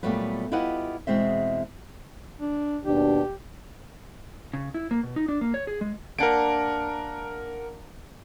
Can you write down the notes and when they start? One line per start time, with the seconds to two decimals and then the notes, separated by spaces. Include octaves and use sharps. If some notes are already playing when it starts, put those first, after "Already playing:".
0.03 A#2 F#3 G3 A3 B3 B4
0.52 E4 F4 G4 B4 D#5 F#5
1.07 E2 B2 G#3 C4 E5
2.41 D4
2.85 D#2 B2 D4 G4
4.53 C#3
4.74 E4
4.91 A#3
5.03 B2
5.16 D#4
5.28 D4
5.41 A#3
5.54 C#5
5.67 G#4
5.81 G#3
6.19 A#3 D4 A#4 F#5 D7